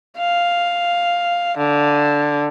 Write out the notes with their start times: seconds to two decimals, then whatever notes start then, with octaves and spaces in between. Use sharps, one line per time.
0.18 F5
1.58 D3